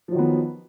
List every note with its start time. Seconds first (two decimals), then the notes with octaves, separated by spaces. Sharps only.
0.08 F3
0.12 F#3
0.15 D#3
0.19 B3